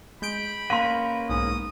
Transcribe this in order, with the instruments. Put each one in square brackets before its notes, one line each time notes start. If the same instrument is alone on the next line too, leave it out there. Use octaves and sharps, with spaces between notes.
[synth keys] G#3 G6 D7 [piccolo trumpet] B5
[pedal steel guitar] A#3 C#4 B4 [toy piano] F5 C6
[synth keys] B1 G#2 [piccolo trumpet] D#6